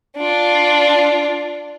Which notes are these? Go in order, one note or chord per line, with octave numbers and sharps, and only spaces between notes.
D4 F4